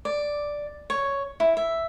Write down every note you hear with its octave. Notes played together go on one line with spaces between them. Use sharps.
D5
C#5
E4
E5